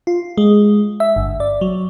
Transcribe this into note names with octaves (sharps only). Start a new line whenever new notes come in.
F4
G#3
E5
G1
D5
F#3